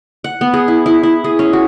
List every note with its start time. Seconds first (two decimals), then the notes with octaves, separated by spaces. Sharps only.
0.24 F#5
0.41 B3
0.54 G#4
0.68 E4
0.86 E4
1.03 E4
1.24 G#4
1.39 C#4
1.53 F#4